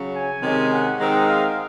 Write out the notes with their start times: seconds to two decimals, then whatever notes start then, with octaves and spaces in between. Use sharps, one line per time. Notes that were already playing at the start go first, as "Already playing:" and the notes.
Already playing: C#3 F#3 C#4
0.14 G#5
0.42 C3 D#3 G#3 C#4
0.71 F#5
0.99 D#3 G#3 C4 D#4
1.28 F5